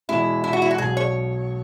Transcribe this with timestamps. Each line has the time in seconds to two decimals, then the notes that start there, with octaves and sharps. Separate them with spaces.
0.09 E2 B2 G#3 E4
0.44 E4
0.53 F#4
0.62 E4
0.71 F#4
0.78 B1 B2 F#3 G#4
0.97 C#5